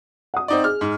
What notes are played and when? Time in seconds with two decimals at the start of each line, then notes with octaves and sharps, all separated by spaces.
0.34 F#5 D#6
0.48 C4 D#4 D5
0.64 G#4 F6
0.81 G#2